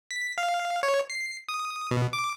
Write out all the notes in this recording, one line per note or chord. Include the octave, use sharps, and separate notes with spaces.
B6
F5
C#5
C7
D#6
B2
D6